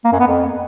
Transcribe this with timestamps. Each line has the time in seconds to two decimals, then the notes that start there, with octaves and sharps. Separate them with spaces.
0.05 A#3
0.12 F#2
0.20 B3
0.27 F2